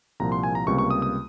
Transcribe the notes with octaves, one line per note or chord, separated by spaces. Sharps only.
C2 A#2 F3 A#5
C6
G#5
A#5
C#2 C3 G3 A#3 C#6
C#6
D#6
D#6